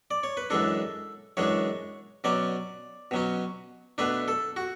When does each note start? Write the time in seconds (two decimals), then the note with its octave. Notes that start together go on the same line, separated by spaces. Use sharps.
0.11 D5
0.23 C#5
0.37 B4
0.50 F#2 E3 G#3 D4 A4
1.37 F#2 E3 G#3 D4 C#5
2.24 B2 F#3 C#4 D5
3.11 B2 F#3 C#4
3.98 B2 A3 D4 B4
4.28 A4
4.56 F#4